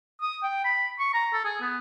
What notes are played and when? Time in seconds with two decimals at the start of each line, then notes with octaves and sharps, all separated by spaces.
0.22 D#6
0.43 G5
0.65 B5
1.00 C#6
1.14 A#5
1.33 A4
1.45 G#4
1.61 B3